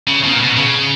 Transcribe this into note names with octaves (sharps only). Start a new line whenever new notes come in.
C#3
B2
A#2
B2
C#3